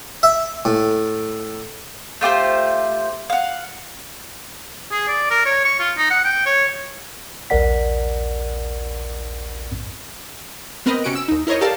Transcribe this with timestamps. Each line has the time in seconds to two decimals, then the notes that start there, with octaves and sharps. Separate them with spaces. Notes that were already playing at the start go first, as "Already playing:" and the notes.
0.23 E5
0.65 A2
2.21 A3 F4 G4 C5
3.30 F5 F#5
4.91 G#4
5.08 D5
5.30 A#4
5.45 C#5
5.65 C#6
5.80 F4
5.97 D#4
6.10 F#5
6.24 G5
6.46 C#5
7.50 A#1 D#2 A#4 D5 F#5 B6
10.86 B3 C4 A#4 B4 D#5
11.04 C3 C#4 F#4 C#7 D7
11.15 E6
11.28 D#2 D#4
11.47 E4 A#4 C5 C#5 D#5
11.61 G4 A4 A#4 D5 F5 A5